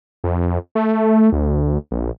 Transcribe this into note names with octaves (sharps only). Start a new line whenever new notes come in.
F2
A3
D2
A#1